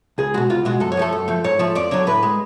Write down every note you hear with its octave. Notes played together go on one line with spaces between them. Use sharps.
C#2 G#4
B2 G#3 F#4
C#2 F4
B2 G#3 F#4
F#2 A4
C#5
F3 A3 A4
F#2
F3 A3
G#2 C#5
F3 A3
F2 D5
D3 F#3 C#5
A2 B4
G#3